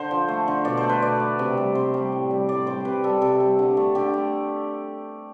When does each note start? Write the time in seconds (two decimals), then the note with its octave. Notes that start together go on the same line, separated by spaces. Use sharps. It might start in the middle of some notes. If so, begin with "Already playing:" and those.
Already playing: D3 C5
0.11 F3
0.28 A3
0.48 D3
0.65 B2 D5
0.77 C5
0.83 A3
0.89 B4
1.02 B2 D5
1.20 A3
1.39 C3
1.57 G3
1.75 C3 C5
1.94 G3
2.12 A2
2.31 G3
2.49 A2 D5
2.67 G3 C5
2.85 C3 B4
3.04 G3 A4
3.21 C3 A4
3.40 G3
3.59 D3
3.77 A3
3.95 D3 G4
4.14 A3